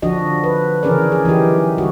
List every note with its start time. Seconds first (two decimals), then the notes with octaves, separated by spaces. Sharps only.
0.02 D3 F3 D4 F#4 D#5
0.44 B4
0.83 C#3 E3 C#4 G#4 A#4 D5
1.12 G#4
1.25 E3 F#3 D#4 G4
1.78 D3 G3 F#4